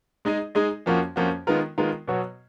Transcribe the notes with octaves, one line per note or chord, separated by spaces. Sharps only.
G#3 D#4 G#4 D#5
G#3 D#4 G#4 D#5
F2 F3 A#3 C#4 F#4
F2 F3 A#3 C#4 F#4
D#3 G#3 B3 F4 A#4
D#3 G#3 B3 F4 A#4
B2 F#3 B3 F#4 C#5